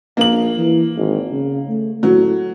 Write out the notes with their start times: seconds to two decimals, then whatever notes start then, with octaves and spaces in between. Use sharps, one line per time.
0.17 A#1 A#3 F#7
0.57 E3
0.97 G#1
1.31 C#3
1.68 A3
2.03 A2 F#3